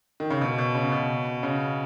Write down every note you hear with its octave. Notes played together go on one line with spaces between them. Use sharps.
D#3
C#3
B2
B2
C#3
B2
C#3